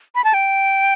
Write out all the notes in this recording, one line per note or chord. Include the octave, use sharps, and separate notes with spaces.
B5
A5
G5